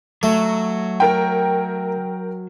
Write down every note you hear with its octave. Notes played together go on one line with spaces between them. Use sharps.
F#3 A3
A#4 G5